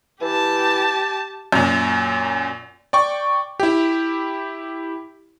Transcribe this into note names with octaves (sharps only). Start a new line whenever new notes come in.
E3 G4 A5
F#2 A#2
D5 G5 C#6
E4 G4